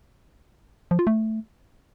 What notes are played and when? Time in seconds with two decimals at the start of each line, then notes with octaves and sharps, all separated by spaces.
0.91 F3
0.99 F4
1.07 A3